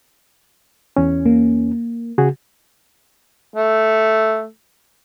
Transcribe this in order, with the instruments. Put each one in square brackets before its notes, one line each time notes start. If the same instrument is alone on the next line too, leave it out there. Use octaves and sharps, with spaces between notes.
[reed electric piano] E2 C#4
[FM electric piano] A#3
[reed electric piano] C#3 F#4 G#4
[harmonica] A3